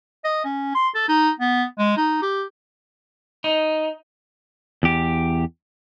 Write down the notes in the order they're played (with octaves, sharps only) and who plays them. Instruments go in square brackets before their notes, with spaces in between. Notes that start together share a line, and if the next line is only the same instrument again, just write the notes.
[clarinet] D#5
C#4
C6
A4
D#4
B3
G#3
D#4
G4
[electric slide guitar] D#4
E2 G4